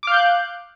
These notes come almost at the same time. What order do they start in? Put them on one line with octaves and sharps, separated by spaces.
D6 F5 G6 F#6